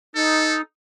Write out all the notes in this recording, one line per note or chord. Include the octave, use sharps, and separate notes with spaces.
D#4 A4